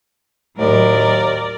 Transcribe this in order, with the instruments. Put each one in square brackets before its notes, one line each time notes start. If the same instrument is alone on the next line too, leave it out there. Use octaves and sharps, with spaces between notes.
[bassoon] D#2 [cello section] A2 F#3 D#4 [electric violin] A#4 D5